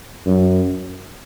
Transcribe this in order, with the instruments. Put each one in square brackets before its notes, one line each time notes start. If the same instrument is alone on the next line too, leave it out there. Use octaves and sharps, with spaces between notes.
[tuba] F#2